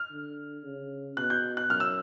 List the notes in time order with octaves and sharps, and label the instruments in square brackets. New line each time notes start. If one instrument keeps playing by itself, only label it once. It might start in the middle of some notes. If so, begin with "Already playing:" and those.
Already playing: [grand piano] F6
[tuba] D3
C#3
[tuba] B2 [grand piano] F#6
[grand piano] G6
F#6
[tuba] F#2 [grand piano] F6
[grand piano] E6